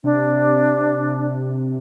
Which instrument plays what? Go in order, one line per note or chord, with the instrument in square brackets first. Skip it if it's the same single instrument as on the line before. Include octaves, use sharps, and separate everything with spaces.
[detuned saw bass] C3 [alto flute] D4